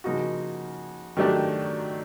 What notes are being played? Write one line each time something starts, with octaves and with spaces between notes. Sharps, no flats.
C#3 F3 A#3 D#4 F#4
D#3 F#3 A3 D4 G4